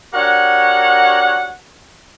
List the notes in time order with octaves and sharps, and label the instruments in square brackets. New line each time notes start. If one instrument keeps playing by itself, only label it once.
[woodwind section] D4 F#4 G4 A#4 C#5 F#5